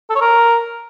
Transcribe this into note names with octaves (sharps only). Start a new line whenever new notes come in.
A4
C#5
A#4